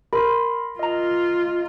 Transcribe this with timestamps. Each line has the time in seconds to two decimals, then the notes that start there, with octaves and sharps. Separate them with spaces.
0.13 A#4 B5 C6
0.79 F4 D#5 A#5